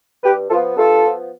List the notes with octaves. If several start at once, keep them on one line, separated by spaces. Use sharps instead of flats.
G2 G4 B4
F3 B3 F4 A4
G2 F4 A4
F3 B3